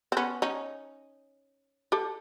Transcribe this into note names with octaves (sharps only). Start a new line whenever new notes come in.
C4
B3 C#4
C#4 D#4
G4 A4